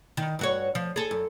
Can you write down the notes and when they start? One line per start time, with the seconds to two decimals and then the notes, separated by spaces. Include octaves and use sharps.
0.17 D#3
0.39 G2 F#4 C#5
0.75 F3
0.96 G#4 A4
1.11 F#2